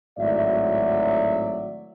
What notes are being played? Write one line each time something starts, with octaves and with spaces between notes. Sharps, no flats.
G#1 A2 F#3 D5 E5